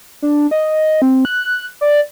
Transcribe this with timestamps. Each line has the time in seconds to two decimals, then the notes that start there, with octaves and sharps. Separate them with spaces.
0.22 D4
0.51 D#5
1.02 C4
1.25 F#6
1.81 D5